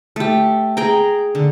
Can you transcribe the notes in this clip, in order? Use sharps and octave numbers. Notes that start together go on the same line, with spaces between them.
A3 G4
G#4 G5 A#5
D3